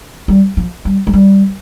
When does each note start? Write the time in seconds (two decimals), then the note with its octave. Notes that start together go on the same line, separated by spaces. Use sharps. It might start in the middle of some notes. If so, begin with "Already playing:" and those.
0.28 G3
0.57 F3
0.85 G3
1.07 G#3
1.13 G3